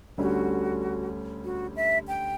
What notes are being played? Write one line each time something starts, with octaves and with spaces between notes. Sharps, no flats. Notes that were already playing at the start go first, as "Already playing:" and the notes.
D2 D3 G3 C#4 F#4
F#4
E5
G5